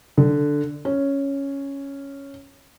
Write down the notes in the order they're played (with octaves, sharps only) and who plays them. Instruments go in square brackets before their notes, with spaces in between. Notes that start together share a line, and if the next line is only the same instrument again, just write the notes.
[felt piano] D3
C#4